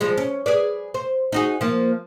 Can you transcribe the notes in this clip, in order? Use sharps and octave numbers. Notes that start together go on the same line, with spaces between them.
F3 G3 G#3
C#4
G#4 B4 D5
C5
D#4 F#4 G#4
F3 A#3